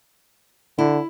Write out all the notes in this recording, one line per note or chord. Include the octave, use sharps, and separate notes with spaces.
D3 E4